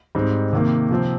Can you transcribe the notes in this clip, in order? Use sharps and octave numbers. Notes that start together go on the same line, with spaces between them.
G#2 G3 C4 D#4
C3 D#3 A#3
C3 F3 C4